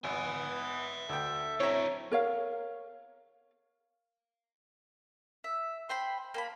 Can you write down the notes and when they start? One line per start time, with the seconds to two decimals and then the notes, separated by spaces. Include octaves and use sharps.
0.04 G#1 B3 E5 G#5
1.09 D2 A4 G5
1.60 D3 C4 E4 C#5 E5 A#5
2.11 A#4 C#5 F5
5.44 E5
5.89 C5 G5 B5 C6
6.34 A#3 A5 B5